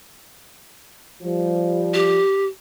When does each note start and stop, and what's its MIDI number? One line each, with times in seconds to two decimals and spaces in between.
1.22 2.18 53
1.22 2.18 55
1.94 2.46 67